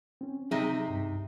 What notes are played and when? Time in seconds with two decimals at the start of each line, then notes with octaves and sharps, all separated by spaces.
0.21 C4 C#4
0.51 C3 F#3 D#4 G#4 E5
0.87 C2 G2